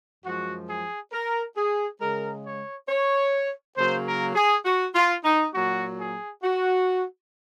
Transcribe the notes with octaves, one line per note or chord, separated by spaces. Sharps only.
F#2 F3 G#3 F#4
G#4
A#4
G#4
C#3 G#3 A#4
C#5
C#5
C#3 F#3 A#3 C5
A#4
G#4
F#4
F4
D#4
A#2 F#3 A#3 F#4
G#4
F#4